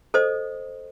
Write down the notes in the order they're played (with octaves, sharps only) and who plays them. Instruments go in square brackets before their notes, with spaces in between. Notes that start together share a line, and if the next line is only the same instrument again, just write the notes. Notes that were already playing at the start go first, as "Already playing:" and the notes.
[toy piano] A4 C5 D#5 D#6